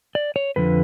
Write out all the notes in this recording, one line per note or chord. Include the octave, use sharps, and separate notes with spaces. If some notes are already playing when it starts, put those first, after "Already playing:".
D5
C#5
F2 D3 F3 B4